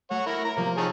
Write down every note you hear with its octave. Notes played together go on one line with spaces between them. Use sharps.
A3 C#5 F#5
E4 A#4 A#6
A#4 A#5
C3 F3 A#3 C4
D#3 G#4 C#5 A5 E6